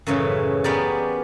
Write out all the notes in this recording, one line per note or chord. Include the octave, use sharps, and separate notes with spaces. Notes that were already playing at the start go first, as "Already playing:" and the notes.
F#2 A2 C#3 E3
B3 C#4 G4 G#4 A#4 D5